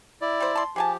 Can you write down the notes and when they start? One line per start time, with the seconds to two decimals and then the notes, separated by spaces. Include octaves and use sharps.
0.22 E4 D5
0.40 G3 C5
0.55 A5 C6
0.76 F3 G4 G#4 G#5 A5